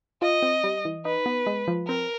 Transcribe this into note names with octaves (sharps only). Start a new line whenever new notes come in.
F4 D#5
C4
G3
E3
D#4 B4
B3
G#3
F3
C4 A#4